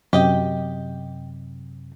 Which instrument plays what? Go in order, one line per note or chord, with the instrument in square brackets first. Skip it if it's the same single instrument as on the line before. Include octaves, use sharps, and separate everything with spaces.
[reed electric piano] F#2 C3 [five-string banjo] G4 D#5 G5